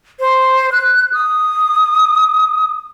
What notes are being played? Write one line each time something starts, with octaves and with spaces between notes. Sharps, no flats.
C5
F#6
D#6